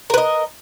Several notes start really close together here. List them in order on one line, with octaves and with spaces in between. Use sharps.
A#4 B4 D#5